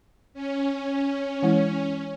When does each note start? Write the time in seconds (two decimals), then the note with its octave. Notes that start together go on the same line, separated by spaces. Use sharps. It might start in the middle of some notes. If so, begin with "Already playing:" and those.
0.34 C#4
1.42 E3 G#3 E4 C#5